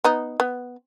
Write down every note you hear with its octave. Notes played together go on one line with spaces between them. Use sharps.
B3 D#4
B3